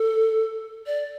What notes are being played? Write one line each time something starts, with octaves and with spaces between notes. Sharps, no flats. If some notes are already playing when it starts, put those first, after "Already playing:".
Already playing: A4
D5